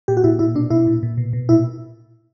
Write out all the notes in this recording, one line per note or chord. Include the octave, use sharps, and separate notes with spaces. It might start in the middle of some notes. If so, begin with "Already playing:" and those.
A#2 G4
F#4
A#2 E4
A#2 E4
B2 D4
B2 E4
A#2
A#2
B2
B2
A#2 E4